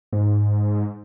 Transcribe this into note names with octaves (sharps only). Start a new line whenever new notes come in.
G#2